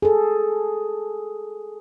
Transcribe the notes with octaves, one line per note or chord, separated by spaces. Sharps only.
G#4 A4